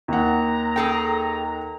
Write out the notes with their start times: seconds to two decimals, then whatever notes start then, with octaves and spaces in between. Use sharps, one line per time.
0.08 D#2 F#5 A#5
0.76 G#4 A4 G5